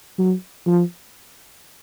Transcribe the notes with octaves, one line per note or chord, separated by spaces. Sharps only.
F#3
F3